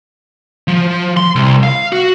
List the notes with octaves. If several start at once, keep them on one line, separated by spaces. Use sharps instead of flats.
F3
C6
C2
F5
F#4